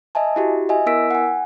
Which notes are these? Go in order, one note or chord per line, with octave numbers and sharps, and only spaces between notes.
D#5 E5 G#5 A5
E4 F#4 G4
D#5 E5 G#5
B3 E4 A#4 E6 B6 D7
F#5 G#5